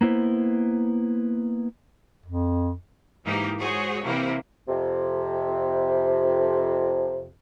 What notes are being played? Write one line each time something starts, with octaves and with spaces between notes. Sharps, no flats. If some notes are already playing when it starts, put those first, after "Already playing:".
A#3 B3 E4 C5
F2
G#2 E3 A#3 D#4 G4
G#3 F#4 G#4 C5 C#5
C3 E3 A#3 E4
F2 C3